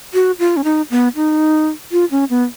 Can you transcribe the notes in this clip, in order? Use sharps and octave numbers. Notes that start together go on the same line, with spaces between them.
F#4
F4
C#4
D#4
B3
D#4
F4
C#4
B3